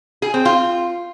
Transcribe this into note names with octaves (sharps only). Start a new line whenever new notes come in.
G#4
C4
F4